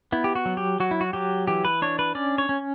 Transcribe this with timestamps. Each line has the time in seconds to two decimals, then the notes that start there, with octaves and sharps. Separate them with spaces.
0.12 B3 E4
0.24 G4
0.35 F#4
0.46 F#3
0.57 G4
0.80 F#3 F#4
0.91 E4
1.01 F#4
1.13 F#3 G4
1.47 E3 G4
1.65 B4
1.82 D4 C#5
1.99 B4
2.15 C#4 D5
2.38 C#5
2.49 C#4